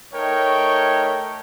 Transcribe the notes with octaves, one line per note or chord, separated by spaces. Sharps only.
A3 D#4 A#4 C#5 G5